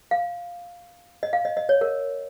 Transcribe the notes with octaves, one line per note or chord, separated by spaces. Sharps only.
F5
D#5
F5
D#5
D#5
C#5
A#4